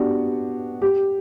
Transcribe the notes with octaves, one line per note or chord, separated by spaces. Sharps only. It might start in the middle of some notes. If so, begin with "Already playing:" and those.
Already playing: B3 D4 F#4 G4
G4